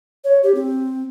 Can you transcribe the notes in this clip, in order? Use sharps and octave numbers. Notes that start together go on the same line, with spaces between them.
C#5
G4
C4